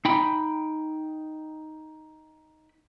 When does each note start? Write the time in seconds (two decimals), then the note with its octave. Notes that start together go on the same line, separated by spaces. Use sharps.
0.05 D#4 G5 B5